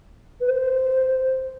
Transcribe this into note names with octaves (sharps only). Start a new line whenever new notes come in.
B4
C5